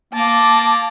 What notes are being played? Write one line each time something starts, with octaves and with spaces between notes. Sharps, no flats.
A#3 A5 D6